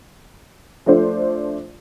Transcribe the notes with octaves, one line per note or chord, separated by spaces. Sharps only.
F3 A3 D4 C5